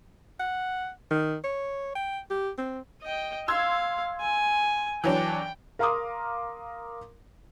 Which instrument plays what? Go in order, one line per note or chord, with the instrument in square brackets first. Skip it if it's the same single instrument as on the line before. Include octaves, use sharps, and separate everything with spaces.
[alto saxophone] F#5
D#3
C#5
G5
G4
C4
[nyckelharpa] D#5 G5
[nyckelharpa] F5 [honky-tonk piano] C6 E6 G#6
[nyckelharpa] G#5
[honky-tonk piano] E3 F#3 D4 [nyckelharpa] G5
[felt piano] A#4 F5 A#5 C6 D6 D#6